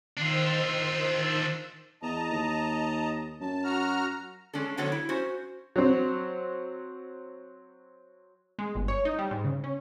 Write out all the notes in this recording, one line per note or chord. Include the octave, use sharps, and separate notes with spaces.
D#3 D4 F4 C5 E6
E2 D#5 A5 A#5
D#2
F#2 A5
F#4 A#5 F6
G#3 C#4 D4 A4
D3 F3 F#3 B3 A4 C#5
E4
C#4 F#4 C5
F#3 C4
G#3
G1
C#5
D#4
G3
G#2
C#3
C#4